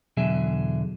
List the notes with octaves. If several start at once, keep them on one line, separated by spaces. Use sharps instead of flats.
E2 B2 D3 F#3 G#4 E5